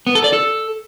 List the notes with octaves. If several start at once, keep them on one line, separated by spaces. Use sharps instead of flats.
B3
A4
D5
A4